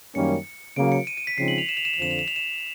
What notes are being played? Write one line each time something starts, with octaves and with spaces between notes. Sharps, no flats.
F#2 D#3 G3 A#3 C#4 C#7
C#3 F#3 A#3 D7
C#7
D#7
D#7
B6
C#3 F3 G#3 C4 D#4 C7
F#7
F7
E7
F7
E7
F7
F2 D3 F3 E7
F7
E7
F7
E7